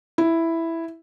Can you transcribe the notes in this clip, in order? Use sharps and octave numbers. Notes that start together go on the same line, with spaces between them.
E4